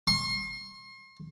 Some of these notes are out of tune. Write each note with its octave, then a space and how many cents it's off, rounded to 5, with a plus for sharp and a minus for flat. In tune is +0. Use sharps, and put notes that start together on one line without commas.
C6 +40